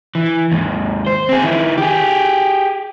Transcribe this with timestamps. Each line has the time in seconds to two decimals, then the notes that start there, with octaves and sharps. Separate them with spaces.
0.15 E3
0.52 D#2 G#2
1.07 C5
1.29 C4 G#4
1.43 D#3 E4
1.77 G4 G#4